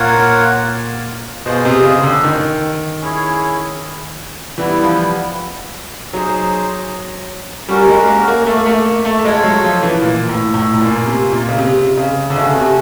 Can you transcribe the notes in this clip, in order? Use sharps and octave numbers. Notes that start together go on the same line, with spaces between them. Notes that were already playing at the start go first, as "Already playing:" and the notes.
Already playing: A#2 F4 A#4 C#5 F#5
B2 F4 G#4 C5 D#5
C3
C#3
D3
D#3
C#4 E4 G#4 C#5
E3 G3 B3 E4
F3
F#3 D#4 G#4 C5
G3 C#4 F#4 A#4
G#3
A#3
A#3
A3
A#3
A3
A#3
A3
A3
G#3 F4 A4 C#5
F#3
F3
E3
A#2
A2
A2
A2
A#2 A#3 C#4 F4
C3
A#2
C#3
C3
C#3
D3
C#3 A3 C#4 F#4
C3